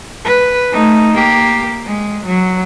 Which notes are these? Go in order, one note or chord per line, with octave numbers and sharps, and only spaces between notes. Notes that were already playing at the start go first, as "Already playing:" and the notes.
B4
A3 D#4
A#3 G4
G#3
F#3